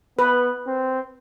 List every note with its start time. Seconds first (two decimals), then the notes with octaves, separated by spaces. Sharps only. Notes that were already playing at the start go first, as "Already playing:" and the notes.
0.19 B3 B4
0.67 C4